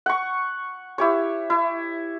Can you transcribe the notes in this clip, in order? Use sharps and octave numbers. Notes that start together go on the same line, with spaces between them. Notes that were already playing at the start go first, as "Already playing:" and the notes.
F#5 C#6
E4 G4 C#5
E4